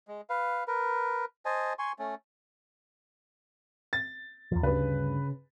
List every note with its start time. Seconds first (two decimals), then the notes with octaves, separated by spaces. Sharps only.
0.08 G#3
0.30 B4 F5
0.68 A#4 B4
1.45 C5 D#5 G#5 A5
1.79 G#5 C6 C#6
1.99 A3 C#4
3.93 A6
4.52 E2 F3
4.63 D2 G2 C#3 B4